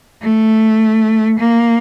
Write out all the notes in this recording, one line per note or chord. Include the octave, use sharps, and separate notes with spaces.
A3
A#3